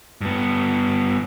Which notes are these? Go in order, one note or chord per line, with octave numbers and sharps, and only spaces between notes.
G2 B3